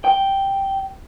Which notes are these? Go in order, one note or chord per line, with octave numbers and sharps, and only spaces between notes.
G5